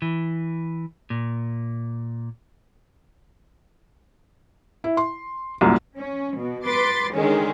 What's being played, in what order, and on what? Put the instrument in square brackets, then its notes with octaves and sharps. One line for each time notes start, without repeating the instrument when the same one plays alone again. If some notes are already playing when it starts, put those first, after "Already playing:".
[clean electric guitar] E3
A#2
[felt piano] E4
C6
C2 F#2 A#2
[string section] C#4
B2
B4 C6 D6 A6
D3 D#3 G#3 C#4